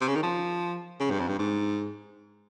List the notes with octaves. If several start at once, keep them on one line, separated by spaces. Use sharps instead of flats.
C3
C#3
D#3
F3
C#3
G2
F2
G2
G#2